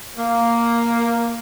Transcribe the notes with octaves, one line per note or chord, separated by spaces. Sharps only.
A#3